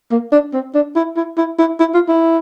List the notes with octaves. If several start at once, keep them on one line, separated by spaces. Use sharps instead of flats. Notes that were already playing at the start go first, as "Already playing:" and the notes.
A#3
D4
C4
D4
E4
E4
E4
E4
E4
F4
E4